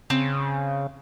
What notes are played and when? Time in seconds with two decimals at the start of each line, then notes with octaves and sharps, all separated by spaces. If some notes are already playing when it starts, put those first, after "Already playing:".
0.10 C#3 C4